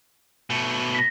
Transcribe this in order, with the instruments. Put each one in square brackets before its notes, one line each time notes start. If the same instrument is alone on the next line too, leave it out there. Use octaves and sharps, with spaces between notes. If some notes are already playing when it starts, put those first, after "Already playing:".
[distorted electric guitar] B2 A3
[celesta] A#6 B6